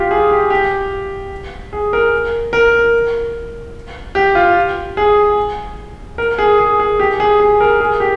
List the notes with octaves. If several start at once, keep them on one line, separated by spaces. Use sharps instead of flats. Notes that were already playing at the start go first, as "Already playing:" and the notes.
Already playing: F4 G4
G#4
G4
G4
G#4
A#4
A#4
G4
F4
G#4
A#4
G#4
G#4
G#4
G4
G#4
G#4
A#4
G#4
G4